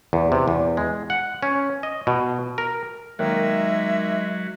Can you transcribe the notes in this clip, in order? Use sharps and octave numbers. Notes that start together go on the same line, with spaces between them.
E2
C3
E2
G#3
F#5
C#4
D#5
B2
A#4
D#3 F#3 G#3 A#3 E5